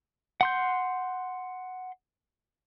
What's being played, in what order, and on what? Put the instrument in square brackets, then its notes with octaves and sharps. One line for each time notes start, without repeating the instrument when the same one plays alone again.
[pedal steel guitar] F#5 C6 G6